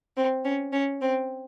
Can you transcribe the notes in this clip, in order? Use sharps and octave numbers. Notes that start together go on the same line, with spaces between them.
C4
C#4
C#4
C4